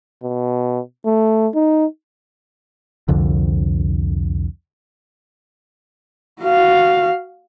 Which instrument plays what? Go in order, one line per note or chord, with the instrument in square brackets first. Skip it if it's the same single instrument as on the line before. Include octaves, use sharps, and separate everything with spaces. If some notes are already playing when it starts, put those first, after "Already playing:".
[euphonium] B2
A3
D#4
[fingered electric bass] C2 F2 D3
[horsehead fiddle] F#4 F5